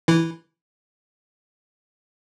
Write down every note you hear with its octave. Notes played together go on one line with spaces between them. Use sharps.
E3 E4